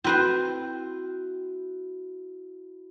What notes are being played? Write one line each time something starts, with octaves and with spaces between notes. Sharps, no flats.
C4 E4 F#4 B4 C5